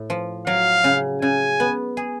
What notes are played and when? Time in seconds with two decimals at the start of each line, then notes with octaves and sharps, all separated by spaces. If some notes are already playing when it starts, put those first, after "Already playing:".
Already playing: A2
0.10 F3
0.47 F#3 F5
0.84 C#3
1.22 C#3 G#5
1.60 B3
1.97 G#4